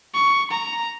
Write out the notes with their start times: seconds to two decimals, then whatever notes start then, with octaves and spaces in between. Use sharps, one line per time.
0.14 C#6
0.51 A#5